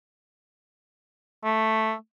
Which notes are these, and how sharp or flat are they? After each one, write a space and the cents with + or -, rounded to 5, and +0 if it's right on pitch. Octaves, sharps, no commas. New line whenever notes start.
A3 +0